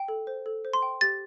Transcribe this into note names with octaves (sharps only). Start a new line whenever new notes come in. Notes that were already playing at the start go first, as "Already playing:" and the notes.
Already playing: G5
A4
C5
A4
C5
C6
G5
G4 A6